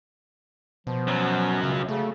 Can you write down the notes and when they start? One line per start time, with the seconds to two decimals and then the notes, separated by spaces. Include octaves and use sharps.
0.87 B2 F3
1.07 F#2 F#3
1.63 C#2 C#3
1.89 C#3 A3